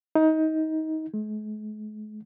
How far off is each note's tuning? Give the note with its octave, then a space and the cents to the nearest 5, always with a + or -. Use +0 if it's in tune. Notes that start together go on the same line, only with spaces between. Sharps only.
D#4 +20
G#3 +45